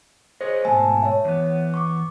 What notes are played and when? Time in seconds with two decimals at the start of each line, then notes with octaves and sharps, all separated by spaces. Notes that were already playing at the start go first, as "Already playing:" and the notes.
0.41 G#4 C5 C#5 D#5
0.65 G#2 B2 A3 G#5 A5
1.02 C#5 E5
1.25 E2 B3
1.74 C#6 D6